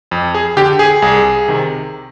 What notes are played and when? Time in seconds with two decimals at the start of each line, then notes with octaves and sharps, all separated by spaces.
0.11 F2
0.35 G#4
0.57 D3 G4
0.79 G#4
1.02 C2 G#4
1.48 C3 D#3